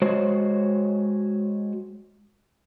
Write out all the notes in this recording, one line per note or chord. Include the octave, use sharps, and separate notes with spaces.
G#3 F#4 C5 C#5